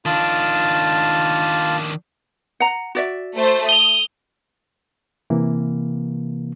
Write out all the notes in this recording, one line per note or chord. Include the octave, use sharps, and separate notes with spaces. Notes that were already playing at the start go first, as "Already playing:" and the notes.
D#3 D4 F4 A5
F#5 A#5
F#4 D5 E5
A3 C5
D#6 F7 G7
C3 E3 A#3